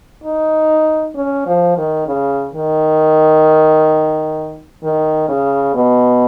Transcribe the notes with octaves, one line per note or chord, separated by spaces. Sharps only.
D#4
C#4
F3
D#3
C#3
D#3
D#3
C#3
B2